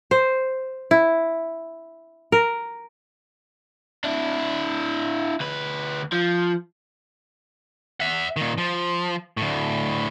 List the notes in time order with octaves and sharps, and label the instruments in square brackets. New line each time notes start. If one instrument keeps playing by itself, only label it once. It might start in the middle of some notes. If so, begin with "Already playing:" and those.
[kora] C5
E4
A#4
[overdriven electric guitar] D4 E4
D2 B4
F3
[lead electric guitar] E5 F#5
A#2 D#3
F3
D2 A2